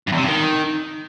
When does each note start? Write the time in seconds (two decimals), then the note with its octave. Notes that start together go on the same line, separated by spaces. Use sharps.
0.07 G2
0.12 E2
0.18 C3
0.23 G2
0.28 D#3